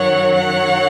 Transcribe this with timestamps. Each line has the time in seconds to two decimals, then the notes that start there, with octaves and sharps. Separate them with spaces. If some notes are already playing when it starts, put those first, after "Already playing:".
Already playing: F#2 D#3 F#3 C#5 F#5
0.35 C#5 F#5